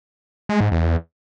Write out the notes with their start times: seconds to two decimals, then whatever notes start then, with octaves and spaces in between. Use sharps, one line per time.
0.49 G#3
0.61 G#2
0.72 E2